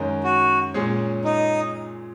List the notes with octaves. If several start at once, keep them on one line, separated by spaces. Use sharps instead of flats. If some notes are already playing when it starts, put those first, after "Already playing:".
Already playing: F#2 D#3 G#3 C#4
F#4
A#2 G#3 C#4 G#4 C#5
D#4